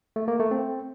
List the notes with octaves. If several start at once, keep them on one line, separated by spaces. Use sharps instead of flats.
A3
A#3
A3
C4